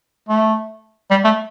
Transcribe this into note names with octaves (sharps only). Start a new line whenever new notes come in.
A3
G3
A3